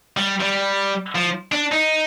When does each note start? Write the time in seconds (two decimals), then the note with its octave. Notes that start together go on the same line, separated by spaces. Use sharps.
0.17 G3
0.41 G3
1.15 F3
1.52 D4
1.72 D#4